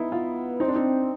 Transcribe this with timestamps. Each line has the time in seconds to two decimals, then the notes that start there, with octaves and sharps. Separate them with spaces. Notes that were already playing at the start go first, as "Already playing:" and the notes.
Already playing: B3 D#4 E4
0.12 F4
0.60 C4 D#4
0.68 D4
0.76 D#4